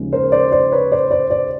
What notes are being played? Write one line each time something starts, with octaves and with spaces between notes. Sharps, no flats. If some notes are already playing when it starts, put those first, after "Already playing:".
Already playing: D#2 C#3 F3 G#3
A#4 C5
C5 D5
C5 D5
B4 C#5
C5 D5
C5 D5
C5 D5